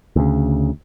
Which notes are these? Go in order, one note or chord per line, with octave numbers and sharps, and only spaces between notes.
D2 C#3